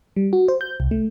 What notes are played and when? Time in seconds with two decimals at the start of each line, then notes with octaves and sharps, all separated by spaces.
0.16 G3
0.33 F#4
0.48 C5
0.61 G6
0.80 C2
0.91 A3